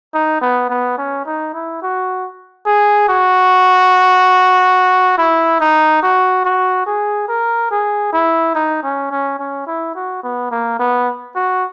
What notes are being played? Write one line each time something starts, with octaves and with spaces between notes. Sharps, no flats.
D#4
B3
B3
C#4
D#4
E4
F#4
G#4
F#4
E4
D#4
F#4
F#4
G#4
A#4
G#4
E4
D#4
C#4
C#4
C#4
E4
F#4
B3
A#3
B3
F#4